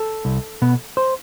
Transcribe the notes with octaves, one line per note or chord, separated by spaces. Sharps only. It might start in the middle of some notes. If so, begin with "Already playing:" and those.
Already playing: A4
C2
B2 B3
C5